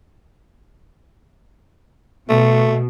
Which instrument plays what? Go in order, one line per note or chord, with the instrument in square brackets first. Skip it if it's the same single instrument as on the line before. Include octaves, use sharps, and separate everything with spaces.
[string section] B2 [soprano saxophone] A3